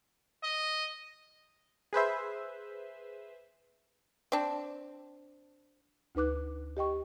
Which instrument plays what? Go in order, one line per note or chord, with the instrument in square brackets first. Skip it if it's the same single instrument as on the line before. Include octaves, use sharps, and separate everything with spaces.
[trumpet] D#5
[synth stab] G#4 B4 C5 E5
[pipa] C4 D4
[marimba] D2 D#4 B4 D6 F#6
G4 D#5 G5 C#6